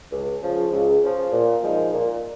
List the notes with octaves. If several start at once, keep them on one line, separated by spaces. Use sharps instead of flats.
C#2
C#3 F3
C#2
C#3 F3
A#2
F3 G#3 D#4 A#4
A#2